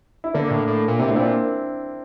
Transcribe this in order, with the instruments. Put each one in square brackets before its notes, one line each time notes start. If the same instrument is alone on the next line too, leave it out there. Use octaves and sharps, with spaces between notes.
[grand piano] E4
[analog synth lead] D3 [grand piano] A#3 D4
[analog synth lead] A2
A2
A#2
[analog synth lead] C3 [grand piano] E4
[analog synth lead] A2 [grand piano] D4
[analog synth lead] A#2 [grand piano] C4 E4